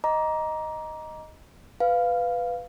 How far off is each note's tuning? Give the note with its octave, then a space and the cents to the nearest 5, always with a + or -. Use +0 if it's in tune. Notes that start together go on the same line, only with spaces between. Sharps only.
D#5 +0 A#5 +15 D6 -15
B4 +10 F5 +0